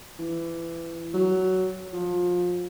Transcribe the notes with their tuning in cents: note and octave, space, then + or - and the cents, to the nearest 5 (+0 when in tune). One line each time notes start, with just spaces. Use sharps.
E3 +20
F#3 +10
F3 +25